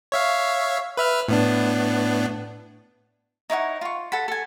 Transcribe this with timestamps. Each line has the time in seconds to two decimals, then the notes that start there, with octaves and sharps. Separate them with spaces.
0.12 C#5 E5 F5
0.97 B4 E5 F6
1.28 A2 B3 D4
3.50 D#4 E4 C#5 F#5
3.81 F4 C#6
4.12 A4 F#5 B5
4.28 A4 G#5